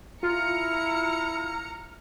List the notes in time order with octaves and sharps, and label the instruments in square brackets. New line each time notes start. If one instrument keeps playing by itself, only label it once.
[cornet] E4 [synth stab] F4 [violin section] A#5 C#7 [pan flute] F6